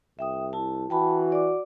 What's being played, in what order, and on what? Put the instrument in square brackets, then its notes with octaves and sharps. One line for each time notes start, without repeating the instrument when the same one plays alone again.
[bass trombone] C2 [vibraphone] E5 G5 D#6
[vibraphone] E4 A5
[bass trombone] E3 [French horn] F#4 [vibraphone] G5 A5 B5
[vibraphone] D5 D6